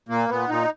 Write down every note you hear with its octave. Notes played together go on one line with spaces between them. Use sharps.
A#2 A#3
A#2 B3
A#2 D#4